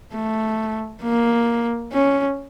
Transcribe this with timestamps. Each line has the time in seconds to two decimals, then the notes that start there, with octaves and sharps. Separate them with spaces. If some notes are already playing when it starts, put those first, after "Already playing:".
0.14 A3
1.02 A#3
1.93 C#4